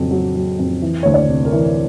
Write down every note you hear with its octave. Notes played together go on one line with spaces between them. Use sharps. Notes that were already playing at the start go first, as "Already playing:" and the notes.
Already playing: F2 C#3 F#3
F#3
F#3
F2
E3
D2 C#5
D5
C3
A#4
E3